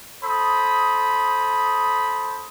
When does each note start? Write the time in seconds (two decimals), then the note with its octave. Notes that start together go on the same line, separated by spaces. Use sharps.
0.23 A4 C5 B5 D#6